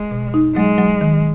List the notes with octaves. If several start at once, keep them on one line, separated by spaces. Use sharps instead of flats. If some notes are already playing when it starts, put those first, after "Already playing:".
Already playing: G#3
B2
D#4
F#3 G#3
F#3
D#3